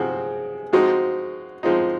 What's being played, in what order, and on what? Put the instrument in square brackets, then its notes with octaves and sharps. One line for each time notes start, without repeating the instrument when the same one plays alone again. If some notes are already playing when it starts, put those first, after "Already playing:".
Already playing: [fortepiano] C3 F3 C4 F#4 [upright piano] G#4
[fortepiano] F3 G#3 C4 D#4 [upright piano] F#4
[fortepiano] F3 G#3 C4 D#4 [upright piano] F4